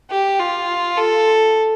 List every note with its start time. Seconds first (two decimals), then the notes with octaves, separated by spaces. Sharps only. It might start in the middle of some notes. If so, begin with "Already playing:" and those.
0.10 G4
0.39 F4
0.97 A4